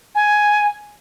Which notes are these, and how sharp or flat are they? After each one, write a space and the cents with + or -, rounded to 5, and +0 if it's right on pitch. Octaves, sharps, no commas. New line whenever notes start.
G#5 +10